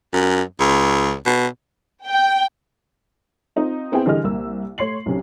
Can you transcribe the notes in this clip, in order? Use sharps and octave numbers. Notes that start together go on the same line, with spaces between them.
F#2
C#2
B2
G5
C4 D#4 F4
B3 C4 E4 G#4 G5
D3 E3 G3 G#4 D#5 F6
C2 A#3 E6
A3 C#5 C6 C7 F#7
B1 C3 C#4